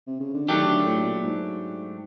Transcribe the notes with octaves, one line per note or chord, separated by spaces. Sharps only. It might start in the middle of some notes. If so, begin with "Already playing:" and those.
C3
C#3
D3
D#3 F#3 A3 D4 G4
D3
A2
A#2
G#2